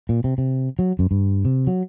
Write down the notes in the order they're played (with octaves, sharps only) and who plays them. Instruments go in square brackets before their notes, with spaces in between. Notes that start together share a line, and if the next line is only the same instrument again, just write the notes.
[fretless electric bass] A#2
C3
C3
F#3
F#2
G2
C3
F#3